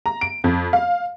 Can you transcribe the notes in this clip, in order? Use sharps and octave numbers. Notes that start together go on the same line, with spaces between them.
A#5
D7
F2
F5